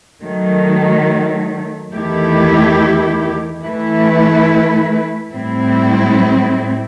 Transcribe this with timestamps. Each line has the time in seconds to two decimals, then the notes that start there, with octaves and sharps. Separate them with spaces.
0.23 D#3 F#3 A3
1.93 E2 D#3 A3 E4 G4
3.63 E3 A3 E4 B4
5.33 A2 G3 C4 E4